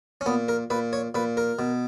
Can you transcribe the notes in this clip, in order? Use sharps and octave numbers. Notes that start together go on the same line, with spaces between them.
C#4
A#2 B3
A#4
A#2 B4
C#5
A#2 B4
A#4
B2